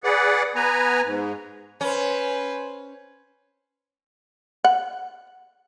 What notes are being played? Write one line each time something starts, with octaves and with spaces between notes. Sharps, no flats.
G#4 B4 D5 F#5
B3 B4 G#5 A#5
G#2
C#4 B4 C5
F#5